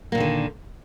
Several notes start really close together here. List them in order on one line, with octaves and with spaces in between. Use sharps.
A#3 A#2 D#3 D3